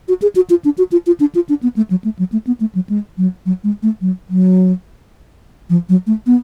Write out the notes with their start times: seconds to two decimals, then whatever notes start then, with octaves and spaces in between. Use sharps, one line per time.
0.08 F#4
0.22 G#4
0.36 F#4
0.50 F4
0.65 D4
0.78 F#4
0.92 F4
1.07 F4
1.20 D4
1.35 F4
1.49 D4
1.63 B3
1.76 A3
1.91 F#3
2.04 A3
2.19 F#3
2.32 A3
2.47 B3
2.60 A3
2.75 F#3
2.89 G#3
3.18 F#3
3.46 F#3
3.64 G#3
3.83 A3
4.01 F#3
4.30 F#3
5.70 F3
5.89 F#3
6.07 A3
6.27 B3